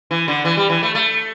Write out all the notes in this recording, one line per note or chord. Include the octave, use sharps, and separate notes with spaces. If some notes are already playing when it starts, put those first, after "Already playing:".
E3
D3
E3
G3
E3
A3
A3